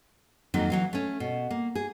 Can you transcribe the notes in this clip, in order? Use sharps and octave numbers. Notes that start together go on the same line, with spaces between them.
F2 D#3 F#3 A#3 C4 D#4
E3 F#3 F5
A3 C#4
B2
A#3
G#4